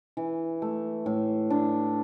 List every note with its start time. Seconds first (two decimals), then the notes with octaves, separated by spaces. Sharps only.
0.17 E3
0.62 A3
1.06 A2
1.50 D4